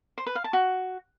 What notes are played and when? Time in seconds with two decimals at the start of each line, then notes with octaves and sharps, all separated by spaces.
0.18 C5
0.26 B4
0.35 F5
0.44 A5
0.53 F#4